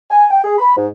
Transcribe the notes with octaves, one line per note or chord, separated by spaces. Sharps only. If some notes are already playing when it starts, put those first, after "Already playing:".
G#5
G5
G#4
B5
G#2